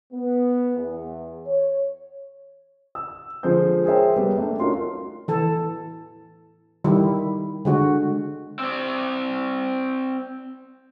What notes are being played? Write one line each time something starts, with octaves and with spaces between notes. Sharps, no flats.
B3
E2
C#5
E6
D3 F3 G#3 C5 G6
G#4 A#4 C5 C#5 E5 G5
G3 B3
A3 A#3 D4
C#4 D#4 F4 F#4 A#4 C6
E3 A4
D#3 G3 E4
D3 G#3 F#4
C4 D5